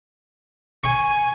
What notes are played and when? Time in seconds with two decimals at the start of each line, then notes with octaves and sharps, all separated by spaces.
0.84 G#5 C#6